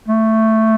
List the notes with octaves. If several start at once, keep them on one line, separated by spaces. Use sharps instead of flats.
A3